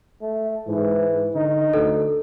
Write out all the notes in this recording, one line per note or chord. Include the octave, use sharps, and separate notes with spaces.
A3
G#2 E3
D3 D#4
D2 A4